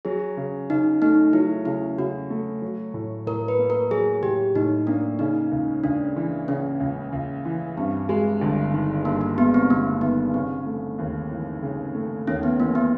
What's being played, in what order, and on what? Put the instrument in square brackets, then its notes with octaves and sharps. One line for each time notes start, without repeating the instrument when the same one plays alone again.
[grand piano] F#3 [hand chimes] G#4
[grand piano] C#3
[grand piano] C#3 [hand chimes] D#4
[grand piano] A3 [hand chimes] D#4
[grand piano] F#3 [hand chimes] E4
[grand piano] C#3 [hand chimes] E4
[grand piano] C#3 [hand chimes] F#4
[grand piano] A3
F#3
A2
[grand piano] A2 [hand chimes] A#4
[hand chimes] B4
[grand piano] A#3
[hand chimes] A#4
[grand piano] F#3 [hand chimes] G#4
[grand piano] A2 [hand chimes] G4
[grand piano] A2 [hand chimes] D#4
[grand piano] A#3 [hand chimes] D4
[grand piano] C#3 [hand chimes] D#4
[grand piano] C#2
[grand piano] C#2 [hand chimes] D4
[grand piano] E3
[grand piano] C#3 [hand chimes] C#4
[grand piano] C#2
C#2
E3
[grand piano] G2 [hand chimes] C4
[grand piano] G#3
G1
D#3
[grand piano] G2 [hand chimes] A#3
[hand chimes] A#3
[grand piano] G#3 [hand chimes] B3
[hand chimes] C4
[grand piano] G1 [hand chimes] A#3
[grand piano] D#3 [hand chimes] B3
[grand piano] C#3 [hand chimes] C4
[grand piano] A3
D#2
E3
C#3
A3
[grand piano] D#2 [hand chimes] C#4
[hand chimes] B3
[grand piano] E3 [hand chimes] A#3
[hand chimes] B3